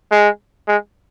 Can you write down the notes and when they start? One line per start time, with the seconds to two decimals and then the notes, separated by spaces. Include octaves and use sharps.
0.11 G#3
0.68 G#3